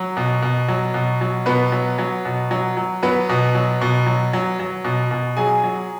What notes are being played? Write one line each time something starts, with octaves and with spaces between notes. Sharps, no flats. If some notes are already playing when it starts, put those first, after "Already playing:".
Already playing: F#3
B2
B2
F#3
B2
F#3
B2 B3 B4
F#3
F#3
B2
F#3
F#3
F#3 B3 B4
B2
F#3
B2
F#3
F#3
F#3
B2
B2
F#3 G#4 G#5
F#3